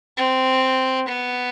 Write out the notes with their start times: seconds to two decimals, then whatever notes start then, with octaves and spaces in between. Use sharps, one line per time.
0.17 C4
1.08 B3